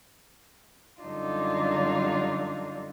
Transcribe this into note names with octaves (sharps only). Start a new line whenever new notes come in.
F#2 D3 G3 D4 D#4 F4